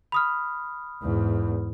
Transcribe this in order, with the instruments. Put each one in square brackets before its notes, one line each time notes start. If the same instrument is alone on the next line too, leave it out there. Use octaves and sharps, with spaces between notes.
[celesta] B5 D#6 F6
[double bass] E2 G#2